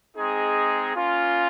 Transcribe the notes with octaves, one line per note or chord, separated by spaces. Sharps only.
G#3 C4 D#4 G#4
A#3 C#4 F4